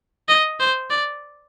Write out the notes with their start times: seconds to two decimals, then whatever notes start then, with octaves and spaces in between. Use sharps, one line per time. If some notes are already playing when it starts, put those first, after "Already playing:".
0.28 D#5
0.60 C5
0.90 D5